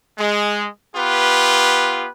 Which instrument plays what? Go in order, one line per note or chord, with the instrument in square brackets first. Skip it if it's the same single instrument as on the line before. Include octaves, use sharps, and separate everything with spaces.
[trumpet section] G#3
B3 F4 G4 B4